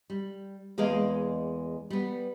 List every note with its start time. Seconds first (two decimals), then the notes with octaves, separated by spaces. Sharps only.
0.10 G3
0.78 E2 G#3 A#3 G#4 D#5 F5
1.90 G3 B3